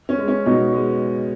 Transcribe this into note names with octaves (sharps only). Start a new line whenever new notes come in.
C#4
G#3
C#4
B2 D#4
G#3